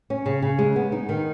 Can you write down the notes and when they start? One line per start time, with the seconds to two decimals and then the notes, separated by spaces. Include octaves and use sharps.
0.10 C#4
0.26 C#3
0.42 C#3
0.59 G#3
0.76 B3
0.92 D#4
1.09 D#3